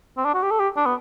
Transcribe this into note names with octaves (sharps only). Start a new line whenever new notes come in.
C4
D4
F#4
G4
A4
G4
D4
B3